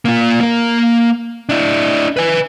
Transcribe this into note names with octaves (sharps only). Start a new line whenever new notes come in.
A#3 F4
A#3 A#4
D4 E4
B4 G#5